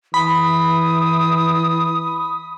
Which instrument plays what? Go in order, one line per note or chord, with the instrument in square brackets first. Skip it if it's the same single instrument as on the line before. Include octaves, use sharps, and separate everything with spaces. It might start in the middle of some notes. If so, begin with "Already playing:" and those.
[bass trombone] E3 [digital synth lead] B5 [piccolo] D#6